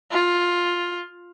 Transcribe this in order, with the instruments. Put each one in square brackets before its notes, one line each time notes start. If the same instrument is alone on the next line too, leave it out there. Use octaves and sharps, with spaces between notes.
[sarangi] F4